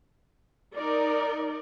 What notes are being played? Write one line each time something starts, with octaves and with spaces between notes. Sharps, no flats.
D#4 A#4 D5